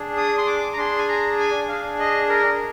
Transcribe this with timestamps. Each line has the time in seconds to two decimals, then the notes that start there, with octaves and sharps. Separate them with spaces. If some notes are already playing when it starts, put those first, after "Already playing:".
Already playing: D4 G#4
0.17 D#6
0.38 C6
0.47 D6
0.73 A#5
0.77 D4 G#4 C6
0.98 G#5
1.09 A#5
1.39 G#5
1.68 D4 G#4 F5
1.99 D#5
2.29 A#4